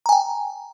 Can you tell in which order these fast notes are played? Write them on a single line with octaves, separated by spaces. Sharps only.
A#5 G#5 G5